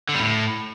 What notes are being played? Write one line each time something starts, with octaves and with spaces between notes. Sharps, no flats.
D3
G3
A2